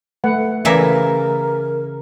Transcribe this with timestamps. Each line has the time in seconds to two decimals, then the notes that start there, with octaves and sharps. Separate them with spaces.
0.24 A3 B4 F#5
0.65 C#3 E3 A3 A#4 D5 E5 A#5